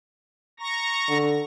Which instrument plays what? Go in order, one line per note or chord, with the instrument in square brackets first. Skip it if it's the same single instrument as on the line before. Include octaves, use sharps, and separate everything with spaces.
[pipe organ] A#5 C#6 A#6
[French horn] D3